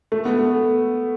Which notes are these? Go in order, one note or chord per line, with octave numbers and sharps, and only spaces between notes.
A3
B3
A3